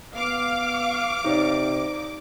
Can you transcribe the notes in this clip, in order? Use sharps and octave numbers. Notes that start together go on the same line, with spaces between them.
B3 F5 D6
C3 D#4 C#5 D5